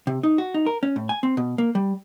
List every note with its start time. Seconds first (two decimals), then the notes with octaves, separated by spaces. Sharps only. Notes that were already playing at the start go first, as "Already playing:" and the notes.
0.07 C3
0.23 D#4
0.38 F#4
0.54 D#4
0.66 A#4
0.83 C#4
0.96 A2
1.09 G#5
1.23 C4
1.37 B2
1.58 A#3
1.75 G3